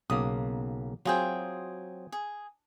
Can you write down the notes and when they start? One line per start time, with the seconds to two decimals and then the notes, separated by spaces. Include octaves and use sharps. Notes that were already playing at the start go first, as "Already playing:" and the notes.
0.10 B1 C#3 A#3 D#6
1.05 F#3 C4 F4 G#4 G5
2.12 G#4